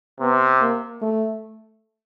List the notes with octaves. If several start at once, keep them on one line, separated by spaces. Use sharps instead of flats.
C3 B3
A#3
A3